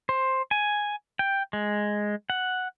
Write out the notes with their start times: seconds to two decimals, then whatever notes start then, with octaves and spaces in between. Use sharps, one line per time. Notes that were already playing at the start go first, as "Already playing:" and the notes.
0.09 C5
0.51 G#5
1.19 G5
1.53 G#3
2.30 F#5